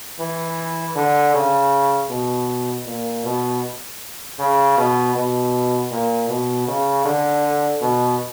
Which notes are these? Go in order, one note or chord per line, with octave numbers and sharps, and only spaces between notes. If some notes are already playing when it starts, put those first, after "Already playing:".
E3
D3
C#3
B2
A#2
B2
C#3
B2
B2
A#2
B2
C#3
D3
B2